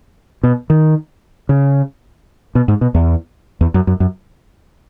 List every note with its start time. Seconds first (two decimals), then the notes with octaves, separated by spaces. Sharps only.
0.43 B2
0.70 D#3
1.49 C#3
2.55 B2
2.68 G#2
2.81 B2
2.95 E2
3.61 E2
3.74 F#2
3.87 F#2
4.00 F#2